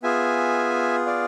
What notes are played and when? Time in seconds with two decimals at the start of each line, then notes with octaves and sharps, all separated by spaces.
0.03 B3 F4 G#4 E5 G#5
1.06 D5 F5